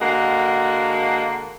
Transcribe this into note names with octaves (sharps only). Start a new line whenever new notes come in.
D3 G#3 A#3 F#4